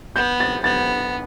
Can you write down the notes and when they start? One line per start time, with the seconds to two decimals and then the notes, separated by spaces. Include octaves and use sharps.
0.16 B3 G6
0.40 A6
0.63 B3 A6